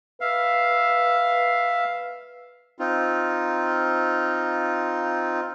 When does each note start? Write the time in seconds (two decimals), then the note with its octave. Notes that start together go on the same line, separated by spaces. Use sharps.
0.21 B4 E5 F5
2.78 C4 D#4 F4